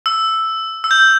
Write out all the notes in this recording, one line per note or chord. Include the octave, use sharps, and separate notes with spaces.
E6
E6
G6